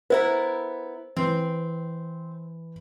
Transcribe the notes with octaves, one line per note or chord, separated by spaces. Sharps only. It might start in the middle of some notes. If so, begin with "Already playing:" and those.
B3 E4 A#4 C5
E3 C4